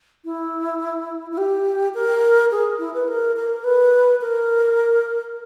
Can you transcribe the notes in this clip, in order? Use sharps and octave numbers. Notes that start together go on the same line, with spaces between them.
E4
E4
G4
A#4
G#4
E4
B4
A#4
A#4
B4
A#4